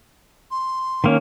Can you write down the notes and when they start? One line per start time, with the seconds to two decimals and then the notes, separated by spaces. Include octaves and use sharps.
0.51 C6
1.04 D#3 A#3 C#4